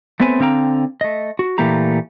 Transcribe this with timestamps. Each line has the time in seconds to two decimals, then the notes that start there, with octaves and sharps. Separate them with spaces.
0.20 A3 B3 C4 B4 C#5 G#5
0.40 D3 C4 F5 G5 A#5
1.01 A3 D#5
1.39 F#4
1.58 A#2 E3 A3 A#3 G4 A#5